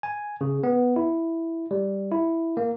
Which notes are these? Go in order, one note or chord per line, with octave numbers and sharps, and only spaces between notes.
G#5
C#3
B3
E4
G3
E4
A#3